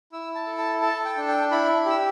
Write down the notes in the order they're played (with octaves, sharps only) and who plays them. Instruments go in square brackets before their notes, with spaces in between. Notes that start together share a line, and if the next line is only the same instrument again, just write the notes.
[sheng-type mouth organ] E4 E6
A5
A4
A5
A4 A5
G5
D4
G5
E4 B5
G4 E6